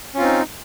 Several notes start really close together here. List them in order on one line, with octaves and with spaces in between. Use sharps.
C#4 F4 C4 D#4